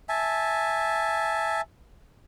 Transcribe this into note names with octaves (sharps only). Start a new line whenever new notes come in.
E5 G#5 A5